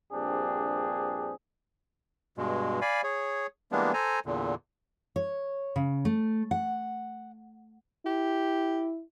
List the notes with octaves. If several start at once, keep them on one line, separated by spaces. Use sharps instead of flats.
A#1 G2 C4 D4 G4 G#4
G2 B2 G#3
D5 F5 G#5 B5
G#4 C#5
E3 G3 G#3 A#3 B3 D4
A4 C5 G#5 A#5
E2 A#2 D3
C#5
C#3
A3
F#5
E4 G4